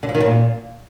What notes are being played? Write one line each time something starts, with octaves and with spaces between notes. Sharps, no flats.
D3
F3
D#3
C#3
A#2